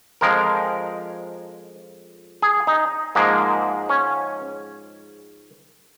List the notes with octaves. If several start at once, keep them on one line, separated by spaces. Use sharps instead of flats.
F2 F3 G#3 A#4
G#4
D#4
G#2 F3 G#3 A#3
C#4